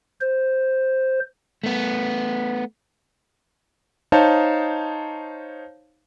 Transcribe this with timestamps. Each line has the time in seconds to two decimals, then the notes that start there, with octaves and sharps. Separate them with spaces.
0.21 C5
1.64 A3 B3
4.12 D#4 C5 C#5 F5 A5